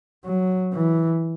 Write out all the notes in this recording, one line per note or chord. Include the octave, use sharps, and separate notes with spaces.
F#3
E3